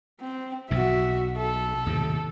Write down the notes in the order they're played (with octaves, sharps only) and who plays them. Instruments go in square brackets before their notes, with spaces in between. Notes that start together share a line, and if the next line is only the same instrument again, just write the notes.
[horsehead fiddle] C4
[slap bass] B1 B2 [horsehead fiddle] F#4 E5
[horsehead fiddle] A4
[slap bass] D#2 A2 C3